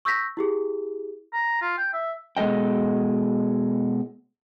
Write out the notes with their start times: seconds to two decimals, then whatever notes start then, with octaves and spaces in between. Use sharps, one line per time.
0.05 C#6 E6 G6 A#6 B6
0.37 E4 G4 G#4
1.33 A#5
1.62 F4
1.78 G5
1.93 E5
2.37 B2 G#3 A4 D#5 G5